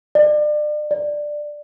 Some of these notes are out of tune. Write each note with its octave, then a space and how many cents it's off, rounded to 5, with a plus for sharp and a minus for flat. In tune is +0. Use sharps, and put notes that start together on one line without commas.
D5 +35
D5 +10